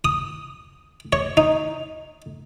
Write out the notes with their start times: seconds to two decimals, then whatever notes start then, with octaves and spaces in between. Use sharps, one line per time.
0.05 D#6
1.13 C#5
1.37 D#4